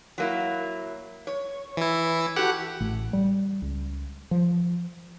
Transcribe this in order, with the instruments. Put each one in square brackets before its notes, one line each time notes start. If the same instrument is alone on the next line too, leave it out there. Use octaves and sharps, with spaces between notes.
[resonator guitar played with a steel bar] F#3 A#3 E4
C#5
[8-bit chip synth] E3 E4
[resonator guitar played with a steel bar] F#4 A4 [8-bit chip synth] G4 F#5
[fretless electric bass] A1
G3
C#2
F3